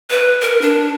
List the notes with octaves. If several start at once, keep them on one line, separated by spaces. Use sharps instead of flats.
B4
A#4
D4